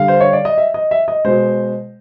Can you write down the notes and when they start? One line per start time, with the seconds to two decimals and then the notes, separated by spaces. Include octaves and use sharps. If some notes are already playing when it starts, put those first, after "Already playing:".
Already playing: D3 G3 F5
0.08 C5
0.21 C#5
0.33 D5
0.45 D#5
0.58 E5
0.74 D#5
0.91 E5
1.08 D#5
1.25 B2 G#3 C5